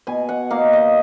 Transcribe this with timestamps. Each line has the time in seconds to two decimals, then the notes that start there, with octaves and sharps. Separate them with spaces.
0.07 B2 G#5
0.29 F#5
0.50 A#3 D#4 F5
0.73 D#5